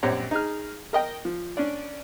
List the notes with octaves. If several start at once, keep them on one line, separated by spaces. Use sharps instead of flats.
A#1 F#2 C4 G4 C#5
D#4 G#4 F6
A#4 D#5 G5
F3
C#4 D4 D5